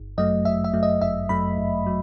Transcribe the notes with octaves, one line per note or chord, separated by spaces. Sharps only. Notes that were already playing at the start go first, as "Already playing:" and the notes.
Already playing: G1
F#2 F#3 A3 D#5
G1 E5
E5
F#2 F#3 A3
D#5
G1 E5
F#2 F#3 A3 B5
G1
F#3